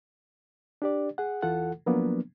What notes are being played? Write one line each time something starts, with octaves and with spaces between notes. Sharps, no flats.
D4 G4 D5
G#4 F#5
E2 E3 F4 A4 F#5
F3 F#3 A#3 B3 D4